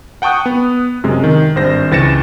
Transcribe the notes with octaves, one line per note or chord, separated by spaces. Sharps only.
F#5 G5 A5 C#6 D#6 F#6
B3
F#2 C3 G#3
D#3
G#1 G2 C5 A#6
C#2 E3 A6 A#6 C#7 E7